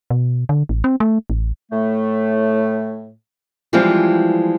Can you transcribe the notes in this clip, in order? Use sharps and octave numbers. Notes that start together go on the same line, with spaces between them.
B2
D3
A1
C4
A3
A1
A2 A3
E3 F3 G3 G#3 C4 F4